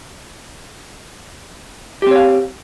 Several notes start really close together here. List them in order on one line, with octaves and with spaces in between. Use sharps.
G4 C4 C#5 F5